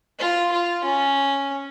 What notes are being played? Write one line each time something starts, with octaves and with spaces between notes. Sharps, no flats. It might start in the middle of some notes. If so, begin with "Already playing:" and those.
F4
F4
C#4